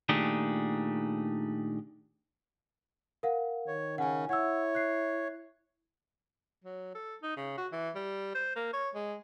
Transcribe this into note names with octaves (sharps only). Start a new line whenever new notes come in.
A#2 D#3 A3 D4 G4 G#4
A#4 F5 F#5
D#3 C#5
C#3 C#4 F#5 G#5
E4 C#5 F#5 E6
F#6 C7
F#3
A4
D#4
C#3
F#4
E3
G3
C5
A#3
C#5
G#3